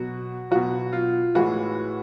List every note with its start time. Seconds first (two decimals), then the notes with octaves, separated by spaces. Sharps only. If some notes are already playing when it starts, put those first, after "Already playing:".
Already playing: B2 F#3 F#4
0.51 B2 F#3 F#4
0.93 F4
1.35 A2 E3 G#3 F#4